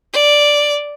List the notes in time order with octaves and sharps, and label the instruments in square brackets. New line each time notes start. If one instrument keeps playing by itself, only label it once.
[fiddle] D5